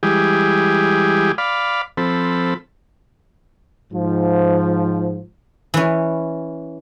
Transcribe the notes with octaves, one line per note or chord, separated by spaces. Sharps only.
E3 G3 G#3 G4 G#4
D5 F5 B5
F3 C4 A4 B5
G#2 F3
E3 C#4